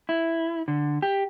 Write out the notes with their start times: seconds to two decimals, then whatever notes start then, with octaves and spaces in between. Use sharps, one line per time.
0.09 E4
0.68 D3
1.02 G4